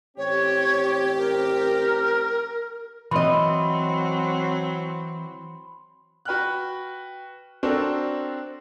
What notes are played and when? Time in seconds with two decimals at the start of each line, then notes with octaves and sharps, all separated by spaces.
0.17 A1 C4 G4 C#5
1.17 A#4
3.11 E3 F#3 C4 D#5 B5 C6
6.25 F#4 B4 G5 F6 F#6
7.63 C4 D4 F#4 A4 A#4